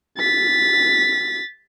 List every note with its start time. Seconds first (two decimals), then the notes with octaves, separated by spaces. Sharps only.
0.18 A6 B6